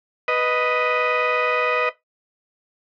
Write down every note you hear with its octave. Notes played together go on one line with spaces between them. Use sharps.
B4 D#5